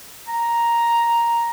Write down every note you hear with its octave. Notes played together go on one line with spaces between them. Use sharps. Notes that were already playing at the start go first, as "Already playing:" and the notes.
A#5